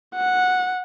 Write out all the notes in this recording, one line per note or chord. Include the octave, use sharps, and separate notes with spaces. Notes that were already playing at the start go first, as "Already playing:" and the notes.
F#5